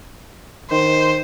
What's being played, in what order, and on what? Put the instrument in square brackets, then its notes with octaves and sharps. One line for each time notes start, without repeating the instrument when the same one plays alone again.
[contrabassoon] D#3 [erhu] C5